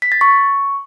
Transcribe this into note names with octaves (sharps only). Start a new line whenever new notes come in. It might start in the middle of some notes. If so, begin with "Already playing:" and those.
B6
A6
C#6